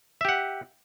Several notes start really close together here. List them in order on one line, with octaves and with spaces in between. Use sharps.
E5 G4 F#5